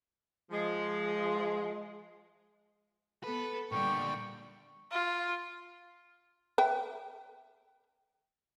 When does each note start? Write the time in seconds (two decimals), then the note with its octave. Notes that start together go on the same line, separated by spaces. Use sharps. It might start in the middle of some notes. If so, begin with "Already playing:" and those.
0.50 F3 G#3
3.24 B3 A4 B4
3.72 A#2 D3 G3 G5 C#6
4.91 F4
6.58 B4 E5 G5